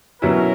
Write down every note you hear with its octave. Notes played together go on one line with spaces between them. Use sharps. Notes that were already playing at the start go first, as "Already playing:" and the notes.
B2 F#3 C#4 E4 A#4